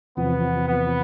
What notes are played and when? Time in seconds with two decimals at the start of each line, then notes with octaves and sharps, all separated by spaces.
0.17 E2 C3 F3 B3
0.67 B3